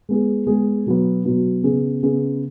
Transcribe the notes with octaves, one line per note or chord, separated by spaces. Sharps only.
G#3 B3 G#4
G#3 B3 G#4
B2 F#3 B3
B2 F#3 B3
C#3 B3 G#4
C#3 B3 G#4